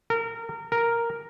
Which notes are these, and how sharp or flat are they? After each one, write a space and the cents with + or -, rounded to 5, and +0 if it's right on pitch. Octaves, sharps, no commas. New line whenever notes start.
A#4 -25
A#4 +0